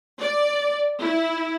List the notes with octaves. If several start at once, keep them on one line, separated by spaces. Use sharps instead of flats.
D5
E4